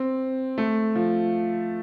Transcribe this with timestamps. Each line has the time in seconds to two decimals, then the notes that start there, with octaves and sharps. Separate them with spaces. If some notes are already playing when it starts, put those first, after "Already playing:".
Already playing: C4
0.58 A3
0.95 F3